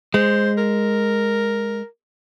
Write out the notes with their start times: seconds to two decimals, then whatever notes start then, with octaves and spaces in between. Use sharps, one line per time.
0.14 G#3 C5
0.58 A#4